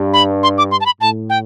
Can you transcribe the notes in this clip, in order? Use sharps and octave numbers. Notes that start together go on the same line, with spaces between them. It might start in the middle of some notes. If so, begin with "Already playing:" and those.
Already playing: G2
B5
C6
D6
C6
A5
B5
A2 A5
G5